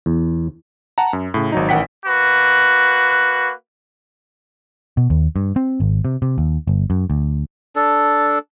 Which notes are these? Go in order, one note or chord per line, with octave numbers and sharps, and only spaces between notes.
E2
F#5 A5 A#5
F#2
A2 C#3
G#1 F#3 D#4
A1 D#3 F#5 G5 B6
A#3 F#4 B4
B2
D#2
G2
C4
G#1
C3
C3
D#2
G1
F#2
D2
D4 A4